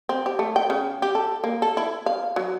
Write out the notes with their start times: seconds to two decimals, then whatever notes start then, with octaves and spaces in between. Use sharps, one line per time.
0.09 C4
0.26 G4
0.39 A3
0.56 G5
0.70 C#3
1.02 G4
1.15 A4
1.44 A#3
1.62 A4
1.77 E4
2.06 F5
2.36 F#3